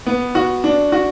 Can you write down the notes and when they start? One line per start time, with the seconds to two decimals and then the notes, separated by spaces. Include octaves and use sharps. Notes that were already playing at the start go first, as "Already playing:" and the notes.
0.06 B3
0.35 F#4
0.64 D4
0.92 F#4